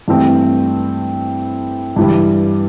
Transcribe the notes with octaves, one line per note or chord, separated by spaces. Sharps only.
G2 E3 A3 C4
G2 E3 G3